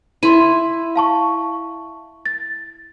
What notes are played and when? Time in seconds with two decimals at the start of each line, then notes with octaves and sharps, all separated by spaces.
0.23 E4 C6 D#7
0.96 F5 A5 C#6
2.26 A6